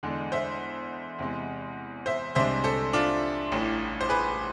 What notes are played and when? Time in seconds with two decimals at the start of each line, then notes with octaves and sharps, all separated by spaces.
0.03 E2 D3 G#3 D4
0.32 C5 E5
1.19 E2 C3 G#3
2.06 C5 E5
2.35 C2 C3 G#3 D4 C5 E5
2.64 A4 C5
2.93 D4 F4
3.52 A1 A2 E3
4.01 C5
4.09 G#4 B4